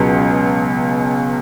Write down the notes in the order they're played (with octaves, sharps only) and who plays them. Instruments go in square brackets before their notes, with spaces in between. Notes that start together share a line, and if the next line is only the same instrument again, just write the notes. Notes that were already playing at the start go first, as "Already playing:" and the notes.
Already playing: [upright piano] C#2 B2 F#3 C#4 G#4